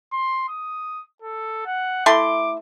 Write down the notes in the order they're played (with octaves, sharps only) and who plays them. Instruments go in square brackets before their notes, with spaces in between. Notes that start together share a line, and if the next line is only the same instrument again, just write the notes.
[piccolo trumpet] C6
D#6
A4
F#5
[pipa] A3 E4 C6 [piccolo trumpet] D6